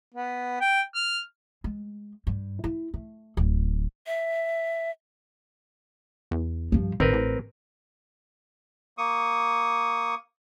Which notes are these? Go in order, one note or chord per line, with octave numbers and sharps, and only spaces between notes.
B3
G5
F6
G#3
G2
E4
A3
D1
E5
E2
G2 F3
A1 D#3 C4 A#4 B4
A2
A#3 C#6 D#6